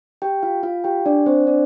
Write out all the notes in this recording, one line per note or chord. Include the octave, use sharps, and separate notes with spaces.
G4 G5
F4 F5
F4 F5
G4 G5
D4 D5
C4 C5
D4 D5